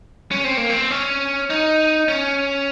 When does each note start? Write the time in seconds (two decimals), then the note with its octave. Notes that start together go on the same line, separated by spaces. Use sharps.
0.31 C#4
0.44 C4
0.57 A#3
0.69 C4
0.91 C#4
1.50 D#4
2.08 C#4